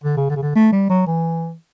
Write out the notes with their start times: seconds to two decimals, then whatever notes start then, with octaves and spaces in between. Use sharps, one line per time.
0.04 D3
0.17 C#3
0.30 D3
0.37 C#3
0.43 D3
0.56 A3
0.72 G3
0.90 F#3
1.07 E3